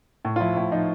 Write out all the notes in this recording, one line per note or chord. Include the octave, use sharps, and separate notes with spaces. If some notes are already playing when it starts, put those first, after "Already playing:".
A2
F4
F3 E4
A2 E4
F3 D#4